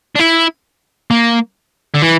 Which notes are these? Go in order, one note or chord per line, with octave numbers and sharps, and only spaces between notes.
D4
E4
A#3
D3
E3